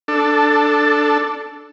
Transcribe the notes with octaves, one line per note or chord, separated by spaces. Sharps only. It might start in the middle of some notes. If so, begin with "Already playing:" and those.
D4 A4